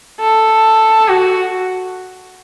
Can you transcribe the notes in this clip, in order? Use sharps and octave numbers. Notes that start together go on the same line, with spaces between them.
A4
F#4